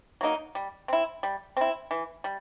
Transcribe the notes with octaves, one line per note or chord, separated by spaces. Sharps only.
F#3 A#3 D#4
G3
C4 E4
G3
C4 E4
E3
G3